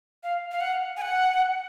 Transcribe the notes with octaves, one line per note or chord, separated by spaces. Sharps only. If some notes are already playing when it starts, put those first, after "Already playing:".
F5
F5
F#5
G#5
F#5